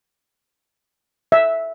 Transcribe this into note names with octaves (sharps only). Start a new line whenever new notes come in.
E5